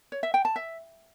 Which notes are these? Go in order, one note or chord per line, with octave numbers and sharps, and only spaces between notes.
C#5
E5
G5
A5
E5